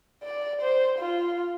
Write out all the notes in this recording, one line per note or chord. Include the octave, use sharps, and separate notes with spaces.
D5
C5
F4